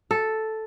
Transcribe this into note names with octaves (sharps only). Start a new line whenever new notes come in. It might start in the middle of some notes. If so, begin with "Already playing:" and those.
A4